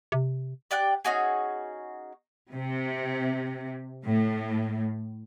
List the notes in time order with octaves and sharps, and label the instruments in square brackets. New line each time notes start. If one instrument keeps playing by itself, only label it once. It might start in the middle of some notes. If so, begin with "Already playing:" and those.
[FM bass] C3
[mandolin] G4 D5 G5 F#6
C#4 D#4 F#4 G#4
[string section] C3
A2